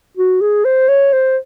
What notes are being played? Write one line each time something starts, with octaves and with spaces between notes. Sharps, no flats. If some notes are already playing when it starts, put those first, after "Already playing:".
F#4
G#4
C5
C#5
C5